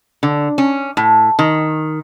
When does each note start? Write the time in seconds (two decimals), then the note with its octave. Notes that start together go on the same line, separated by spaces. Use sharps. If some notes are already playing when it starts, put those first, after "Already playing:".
0.23 D3
0.58 C#4
0.97 A2
1.39 D#3